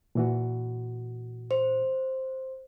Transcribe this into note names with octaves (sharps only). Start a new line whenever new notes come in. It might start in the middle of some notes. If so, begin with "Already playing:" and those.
A#2 E3 F#4
C5